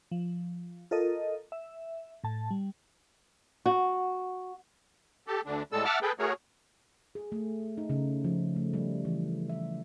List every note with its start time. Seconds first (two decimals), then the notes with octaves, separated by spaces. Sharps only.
0.11 F3
0.91 F4 A4 A#4 D#5
1.52 E5
2.24 A2 A5
2.51 G3
3.66 F#4
5.27 G4 A4
5.46 D2 D3 D4
5.72 A2 G3 G#3 A4 E6
5.85 E5 F#5 A5 D6 E6 F6
6.02 G#4 A4 B4 G5
6.19 A3 F#4 G#4 A#4 C#5
7.15 G#4
7.32 A3
7.78 D#4
7.89 C#3
8.24 F3
8.56 A3
8.73 G3
9.05 E3
9.49 E5